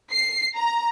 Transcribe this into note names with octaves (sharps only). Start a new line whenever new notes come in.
C7
A#5